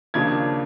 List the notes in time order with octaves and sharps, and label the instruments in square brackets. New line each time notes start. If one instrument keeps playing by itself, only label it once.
[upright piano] D#2 C#3 F3 A#3 D4 G#6